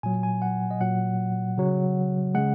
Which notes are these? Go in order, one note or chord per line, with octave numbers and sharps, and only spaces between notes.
A#2 F#3 G#5
G#5
F#5
D#5
A#2 F#3 F#5
C#3 F#3
C#3 G#3 F#5